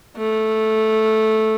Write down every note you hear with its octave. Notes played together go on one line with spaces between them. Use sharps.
A3